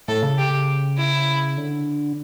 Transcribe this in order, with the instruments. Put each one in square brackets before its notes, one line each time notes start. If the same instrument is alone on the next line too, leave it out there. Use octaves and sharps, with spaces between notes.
[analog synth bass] A2 [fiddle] A4
[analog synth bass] C#3
[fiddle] G4
E4
[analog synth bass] D3